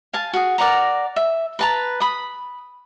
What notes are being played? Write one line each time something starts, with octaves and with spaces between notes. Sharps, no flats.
F5 G#5 A5
F#4 G#4
A#4 D5 F#5 A#5
E5
B4 A5 A#5
B5 D#6